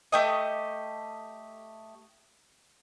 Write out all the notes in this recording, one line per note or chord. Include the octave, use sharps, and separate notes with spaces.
A3 G4 D#5